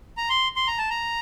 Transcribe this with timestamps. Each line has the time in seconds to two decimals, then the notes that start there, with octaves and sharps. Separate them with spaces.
0.17 A#5
0.30 C6
0.56 C6
0.67 A#5
0.78 A5
0.90 A#5